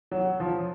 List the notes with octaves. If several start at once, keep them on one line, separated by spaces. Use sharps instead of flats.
F#3
F3